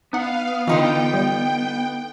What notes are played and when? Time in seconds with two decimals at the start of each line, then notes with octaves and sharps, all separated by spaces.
0.13 B3 D#4 F5 F#5
0.67 D3 E3 D#4 F4 G5
1.14 G3